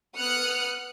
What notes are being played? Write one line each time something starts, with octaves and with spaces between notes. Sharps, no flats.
B3 D#6 F6 F#6 C#7